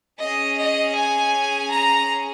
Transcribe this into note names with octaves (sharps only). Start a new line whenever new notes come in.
C#4 G#4 D#5
D#5
G#5
A#5